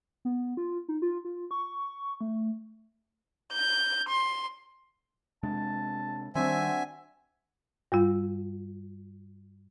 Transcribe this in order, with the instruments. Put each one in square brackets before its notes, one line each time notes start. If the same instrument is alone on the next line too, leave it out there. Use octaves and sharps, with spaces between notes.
[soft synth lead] B3
F4
D#4
F4
F4
C#6
A3
[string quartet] G6
C6
[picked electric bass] C3 G#3 D4 [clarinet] A5
[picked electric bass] D#3 G3 [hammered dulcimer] C4 D4 F#4 [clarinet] C5 [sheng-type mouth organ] E5 G#5
[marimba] G2 G3 F4